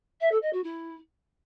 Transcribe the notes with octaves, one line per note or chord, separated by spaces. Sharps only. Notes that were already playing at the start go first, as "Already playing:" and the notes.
E5
A4
D#5
F#4
E4